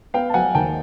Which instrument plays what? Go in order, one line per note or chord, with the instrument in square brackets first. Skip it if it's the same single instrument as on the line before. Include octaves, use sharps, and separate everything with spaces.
[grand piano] B3 [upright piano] F5 G5
[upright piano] A5
[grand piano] F#3 [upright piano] F#5 G#5
[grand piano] D#2 [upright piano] G5 A5